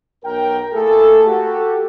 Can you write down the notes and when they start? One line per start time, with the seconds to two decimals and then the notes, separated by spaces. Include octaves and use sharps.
0.24 B1 A#4 G5
0.73 A3 A#3 E4 G#4 A4
1.27 F#4 G4 A4